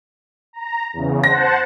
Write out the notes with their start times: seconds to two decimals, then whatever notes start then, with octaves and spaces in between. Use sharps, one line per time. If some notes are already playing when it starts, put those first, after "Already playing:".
0.53 A#5
0.93 E2 C#3
1.24 C5 F#5 A5 A#6